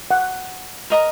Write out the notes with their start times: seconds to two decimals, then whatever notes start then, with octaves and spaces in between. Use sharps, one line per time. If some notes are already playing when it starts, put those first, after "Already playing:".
0.11 F#5
0.90 A#4 D#5 A#5